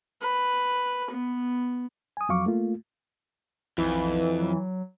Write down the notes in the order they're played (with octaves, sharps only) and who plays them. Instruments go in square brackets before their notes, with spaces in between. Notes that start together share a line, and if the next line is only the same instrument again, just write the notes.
[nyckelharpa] B4
B3
[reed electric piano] G#5 D#6
F2 F#3 F5 C#6 D6
A3 A#3 F4
[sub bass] B1 [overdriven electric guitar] F2 [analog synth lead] E3
[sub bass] F#3